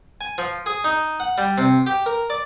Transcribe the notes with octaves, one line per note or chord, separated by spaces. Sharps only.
G#5
F3
G#4
D#4
F#5
G3
C3
G4
A#4
D5